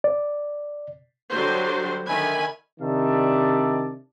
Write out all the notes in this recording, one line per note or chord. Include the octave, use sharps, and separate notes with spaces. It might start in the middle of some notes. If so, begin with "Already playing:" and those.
D5
D3 F#3 G3 A4 C5
D3 D#3 E5 G#5 B5
C3 D#3 D4 D5 E5 A5